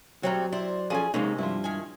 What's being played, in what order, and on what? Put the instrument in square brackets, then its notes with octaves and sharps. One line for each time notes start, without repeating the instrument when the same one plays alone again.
[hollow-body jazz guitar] F#3 [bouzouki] G3 A3 C4 [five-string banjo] C#5 A#5
[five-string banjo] E4 [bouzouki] C5 D5
[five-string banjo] F3 C#4 A4 [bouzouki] G#4 G#5
[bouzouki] C3 [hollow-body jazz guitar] G#3 A#3 D#4 [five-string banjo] C#4
[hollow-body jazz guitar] G2 [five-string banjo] F3 F#3 E4
[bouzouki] D#3 G#5